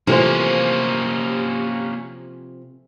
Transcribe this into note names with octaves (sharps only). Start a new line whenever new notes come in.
C3 E3 F3 A3 A#3 C#4 G4 C5